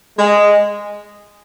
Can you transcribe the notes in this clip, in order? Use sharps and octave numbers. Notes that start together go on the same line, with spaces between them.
G#3